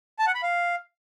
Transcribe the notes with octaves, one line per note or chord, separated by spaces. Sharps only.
A5
F#5
B5
F5